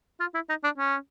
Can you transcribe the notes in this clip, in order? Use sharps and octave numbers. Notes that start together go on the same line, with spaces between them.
F4
E4
D#4
D4
C#4